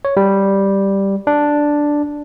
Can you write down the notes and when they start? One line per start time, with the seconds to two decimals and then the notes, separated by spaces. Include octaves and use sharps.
0.05 C#5
0.17 G3
1.27 D4